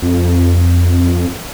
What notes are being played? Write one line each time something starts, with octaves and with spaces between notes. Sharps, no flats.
F2